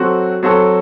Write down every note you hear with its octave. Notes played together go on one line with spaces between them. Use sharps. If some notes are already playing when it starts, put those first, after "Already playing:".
Already playing: F#3 C4 F#4 A4
F#3 C4 F#4 A4